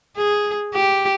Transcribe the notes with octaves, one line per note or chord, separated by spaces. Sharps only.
G#4
G4